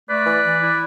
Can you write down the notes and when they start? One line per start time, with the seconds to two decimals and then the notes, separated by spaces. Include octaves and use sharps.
0.09 A3 B4 D5
0.26 E3
0.44 E3
0.61 E4